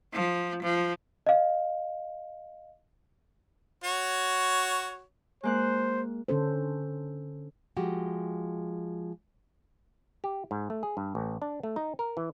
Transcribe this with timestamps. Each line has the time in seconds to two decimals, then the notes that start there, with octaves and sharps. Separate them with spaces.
0.13 F3
0.63 F3
1.26 D#5 F5
3.84 F#4 C#5
5.43 G#3 A#3 C5 F#6
6.28 D3 C#4 A4 C5
7.77 F3 G#3 F#4 G4
10.24 G4
10.51 G#2
10.70 A3
10.83 G#4
10.97 G2
11.15 A1
11.42 D4
11.63 A3
11.76 D#4
11.99 A#4
12.17 E3